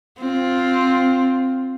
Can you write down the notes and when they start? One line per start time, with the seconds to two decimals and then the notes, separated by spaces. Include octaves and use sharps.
0.20 C4 F4